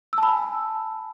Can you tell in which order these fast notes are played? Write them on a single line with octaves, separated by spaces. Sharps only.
E6 A5 B5 G#5